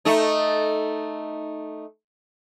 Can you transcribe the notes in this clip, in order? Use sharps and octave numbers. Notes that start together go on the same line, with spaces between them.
A3 D#4